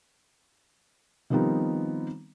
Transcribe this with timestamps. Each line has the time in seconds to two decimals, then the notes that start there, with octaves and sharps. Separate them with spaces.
1.30 D#3 F3 G3 B3 C4 D#4